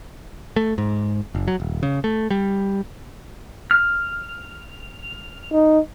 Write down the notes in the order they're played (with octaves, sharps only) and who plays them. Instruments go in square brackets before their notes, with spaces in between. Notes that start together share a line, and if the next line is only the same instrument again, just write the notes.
[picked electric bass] A3
G#2
F#1
F#3
D#1
C#3
A3
G3
[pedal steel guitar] F6
[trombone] D#4